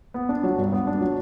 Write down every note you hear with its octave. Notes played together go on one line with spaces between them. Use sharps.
B3
D4
F#3
G2
B3
D4
F#3